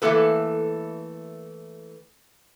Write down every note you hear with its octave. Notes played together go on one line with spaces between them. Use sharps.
E3 A3 A#3 A4 B4